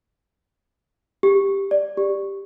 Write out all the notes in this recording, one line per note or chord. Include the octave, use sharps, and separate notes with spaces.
G4
D5
G4